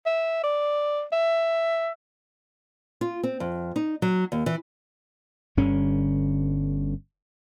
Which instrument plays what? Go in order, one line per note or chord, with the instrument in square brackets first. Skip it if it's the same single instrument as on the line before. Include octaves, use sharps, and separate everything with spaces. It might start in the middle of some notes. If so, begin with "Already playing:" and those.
[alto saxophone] E5
D5
E5
[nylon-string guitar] F4
C4
F2
D#4
F#3
D#2
E3
[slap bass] G1 G2 D3 C#4